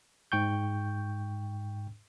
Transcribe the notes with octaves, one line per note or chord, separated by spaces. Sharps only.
G#2 G5 C#6 G6